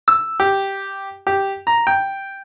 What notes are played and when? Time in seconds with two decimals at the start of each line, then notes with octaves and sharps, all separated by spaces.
0.08 E6
0.40 G4
1.27 G4
1.67 A#5
1.87 G5